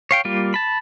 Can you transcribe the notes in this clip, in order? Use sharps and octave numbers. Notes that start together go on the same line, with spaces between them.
C#5 F5 G5
G3 A#3 F4
A5 B5